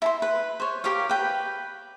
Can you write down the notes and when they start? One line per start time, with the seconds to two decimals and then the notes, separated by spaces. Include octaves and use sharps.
0.02 E4 A5 C6
0.22 B4
0.60 C5 C#5
0.84 G4 A#4 C#5 F5
1.09 B4 G5